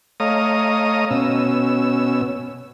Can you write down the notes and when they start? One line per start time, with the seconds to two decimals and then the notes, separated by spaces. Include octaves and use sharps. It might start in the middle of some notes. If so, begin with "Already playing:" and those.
0.20 A3 C#5 D#5 F5 A#5 D#6
1.10 B2 C#4 E6